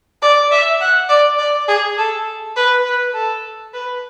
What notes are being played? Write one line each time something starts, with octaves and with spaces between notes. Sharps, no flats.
D5
E5
F#5
D5
D5
G#4
A4
B4
B4
A4
B4